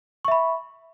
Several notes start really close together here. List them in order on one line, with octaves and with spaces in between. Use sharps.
C#6 E5 B5